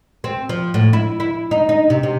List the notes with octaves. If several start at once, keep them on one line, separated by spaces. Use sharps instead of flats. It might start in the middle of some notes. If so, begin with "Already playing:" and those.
C4
F3
A2
E4
E4
D#4
D#4
C3
C3